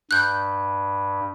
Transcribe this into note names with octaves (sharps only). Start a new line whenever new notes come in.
G2 F#6 G6